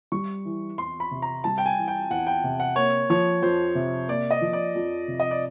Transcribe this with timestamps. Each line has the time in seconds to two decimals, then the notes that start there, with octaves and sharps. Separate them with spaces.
0.12 G3 C#6
0.45 E3
0.78 E2 C6
1.00 B5
1.11 C3
1.22 A#5
1.44 G3 A5
1.58 G5
1.66 G#5
1.78 E3
1.88 G5
2.11 E2 F#5
2.27 G5
2.44 C3
2.60 F#5
2.76 A#3 C#5
3.10 F3 C#5
3.42 F2 C5
3.75 C3
4.09 A#3 D5
4.31 D#5
4.41 F3
4.53 D5
4.75 F2
5.08 C3
5.20 D#5
5.31 D5